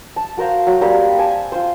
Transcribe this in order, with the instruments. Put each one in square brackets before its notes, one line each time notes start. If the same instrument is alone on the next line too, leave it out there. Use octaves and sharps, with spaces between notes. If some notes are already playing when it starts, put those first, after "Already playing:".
[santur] A5
F#4 A#4 C5 F5
F#3
G3 A#3 C4 G4
G#5 A5
F4 C5